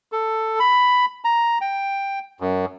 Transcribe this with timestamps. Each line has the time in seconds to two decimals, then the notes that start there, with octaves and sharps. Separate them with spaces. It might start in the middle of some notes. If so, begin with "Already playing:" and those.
0.12 A4
0.60 B5
1.25 A#5
1.61 G5
2.40 F#2